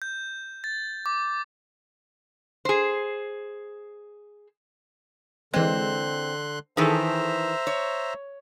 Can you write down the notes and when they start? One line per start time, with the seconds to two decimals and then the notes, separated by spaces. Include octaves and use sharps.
0.02 G6
0.64 A6
1.06 D6
2.65 G#4 C5
5.54 D3 E3 G#3 C4 C6 F#6
6.77 D#3 E3 G#4 A4 C5 E5 A#5
7.67 C#5